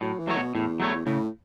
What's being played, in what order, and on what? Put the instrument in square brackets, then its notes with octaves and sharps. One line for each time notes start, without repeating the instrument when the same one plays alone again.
[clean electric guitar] A2 [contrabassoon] F#3
[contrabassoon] E3
[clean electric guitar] F#3 A3 F#4 C#5
[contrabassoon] B2
[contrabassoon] E2 [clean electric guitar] A2
[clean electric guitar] F#3 A3 E4 C#5
[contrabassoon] A2 [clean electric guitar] C#3